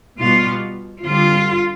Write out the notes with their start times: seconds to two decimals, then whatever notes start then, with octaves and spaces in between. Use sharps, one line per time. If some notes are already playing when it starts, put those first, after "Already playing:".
0.19 B2 G3 B3 F4
1.04 D3 G3 C4 F4